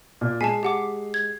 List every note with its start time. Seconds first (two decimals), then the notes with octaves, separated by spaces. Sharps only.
0.21 A#2
0.41 G#3 G#5 A5 B6 C7
0.63 G4 F#5 D6
1.14 G#6